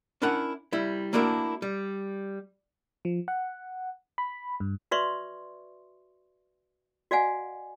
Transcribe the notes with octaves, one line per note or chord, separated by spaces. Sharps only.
C#4 D4 E4 A#4 F#5
G3 E4
A3 A#3 D4 E4 F#4 A#4
G3
F3
F#5
B5
G2
F#4 B4 D5 E5 C6 C#6
F#4 D5 D#5 F5 F#5 G#5